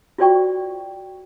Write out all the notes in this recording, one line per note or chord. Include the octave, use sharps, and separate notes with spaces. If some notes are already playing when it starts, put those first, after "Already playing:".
F4 F#4 C5 D5 G5 C#6